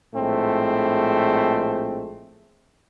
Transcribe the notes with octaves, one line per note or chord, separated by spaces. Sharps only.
A#1 A2 G#3 A3 C4